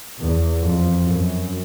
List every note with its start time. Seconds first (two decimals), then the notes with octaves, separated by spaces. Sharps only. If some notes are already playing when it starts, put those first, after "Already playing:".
0.19 E2
0.62 F2
1.06 F#2